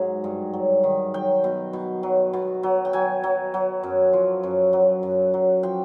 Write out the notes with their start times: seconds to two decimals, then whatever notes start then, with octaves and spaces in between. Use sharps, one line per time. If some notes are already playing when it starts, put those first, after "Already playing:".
Already playing: G#2 F#3
0.24 G2
0.54 F#3
0.83 D#3
1.14 F#3 G5
1.44 B2
1.73 B2
2.03 F#3
2.33 B2
2.63 F#3
2.85 G5
2.93 F#3 G#5
3.24 F#3
3.54 F#3
3.83 F#2
4.13 F3
4.43 F#2
4.73 F#3
5.03 F#2
5.34 F#3
5.63 F3 G5